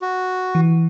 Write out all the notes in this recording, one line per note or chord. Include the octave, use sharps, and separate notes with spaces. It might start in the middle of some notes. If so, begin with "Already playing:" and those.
F#4
E3